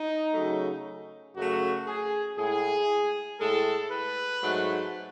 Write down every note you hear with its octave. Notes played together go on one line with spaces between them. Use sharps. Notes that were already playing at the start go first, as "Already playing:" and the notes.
Already playing: D#4
C#3 F#3 A3
F#2 C#3 F#3 A3 F#4
G#4
A2 G#3 G#4
A2 G#3 A4
B4
G#2 F#3 A3